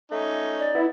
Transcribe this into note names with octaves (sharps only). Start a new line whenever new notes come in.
A3 C#4 D#4
D5
B3 E4